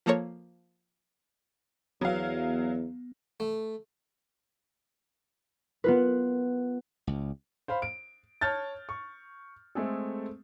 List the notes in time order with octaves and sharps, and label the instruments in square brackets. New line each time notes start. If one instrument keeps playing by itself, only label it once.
[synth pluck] F3 A#3 A4 A#4 C#5
[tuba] E2 [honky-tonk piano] F#3 F5 [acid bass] B3
[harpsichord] A3
[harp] B3 F4 B4
[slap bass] C#2
[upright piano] C5 F5 B5
D7
C#5 A5 F6 G6 A6
C#6
G#3 A3 C4 G#4 A4